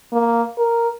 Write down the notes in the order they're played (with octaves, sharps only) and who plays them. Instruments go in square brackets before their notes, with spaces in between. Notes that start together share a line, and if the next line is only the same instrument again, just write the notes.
[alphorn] A#3
A#4